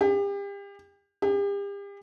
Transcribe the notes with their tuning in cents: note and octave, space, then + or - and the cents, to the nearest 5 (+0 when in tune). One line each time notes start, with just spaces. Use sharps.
G4 +35
G4 +40